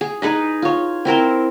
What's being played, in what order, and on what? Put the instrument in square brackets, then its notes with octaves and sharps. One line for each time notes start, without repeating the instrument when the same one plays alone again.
[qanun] G#4
D#4 G#4 B4 D#5
F4 C#5
C4 E4 A#4 C5